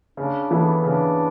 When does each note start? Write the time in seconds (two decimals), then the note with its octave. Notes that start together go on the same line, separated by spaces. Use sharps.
0.17 C#3 D4
0.51 E3 B3 E4 A4
0.83 C#3 D4